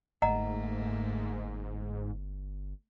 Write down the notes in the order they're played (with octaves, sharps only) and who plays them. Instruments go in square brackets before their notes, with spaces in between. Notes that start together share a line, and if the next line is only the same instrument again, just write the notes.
[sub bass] G1 [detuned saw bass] G#2 [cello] A3 A#3 [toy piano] D#5 F#5 A#5